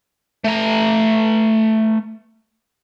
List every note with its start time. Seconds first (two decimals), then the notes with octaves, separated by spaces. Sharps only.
0.44 A3 A#5